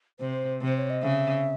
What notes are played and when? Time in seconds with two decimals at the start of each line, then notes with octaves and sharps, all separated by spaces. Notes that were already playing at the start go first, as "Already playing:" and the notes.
0.20 C3 C5
0.61 C3 C5
0.77 C#5
0.90 D#5
1.03 C#3 E5